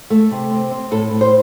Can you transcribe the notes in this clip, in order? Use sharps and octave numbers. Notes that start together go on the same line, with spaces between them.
A3
C3
C4
C4
A2 A4
A2
C5